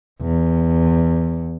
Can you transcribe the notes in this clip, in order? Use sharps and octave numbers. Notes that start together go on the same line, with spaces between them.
E2